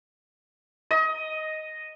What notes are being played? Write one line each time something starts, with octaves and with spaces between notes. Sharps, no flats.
D#5